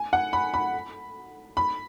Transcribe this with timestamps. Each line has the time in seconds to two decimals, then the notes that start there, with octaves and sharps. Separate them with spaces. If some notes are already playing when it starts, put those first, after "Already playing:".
Already playing: G#5
0.13 F#5
0.33 B5
0.54 B5
1.57 B5